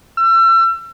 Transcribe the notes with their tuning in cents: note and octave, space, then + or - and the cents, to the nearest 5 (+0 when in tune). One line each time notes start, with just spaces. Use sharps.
E6 +35